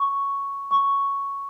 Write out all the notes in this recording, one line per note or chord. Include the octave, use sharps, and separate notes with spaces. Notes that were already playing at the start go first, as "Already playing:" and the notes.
Already playing: C#6
C#6